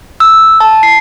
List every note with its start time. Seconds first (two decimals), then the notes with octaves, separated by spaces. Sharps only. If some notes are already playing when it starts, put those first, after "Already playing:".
0.20 E6
0.60 A5
0.83 C7